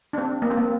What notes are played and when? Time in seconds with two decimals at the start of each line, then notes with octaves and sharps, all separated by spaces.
0.13 D4
0.18 C4
0.42 A#3
0.50 C4
0.58 A#3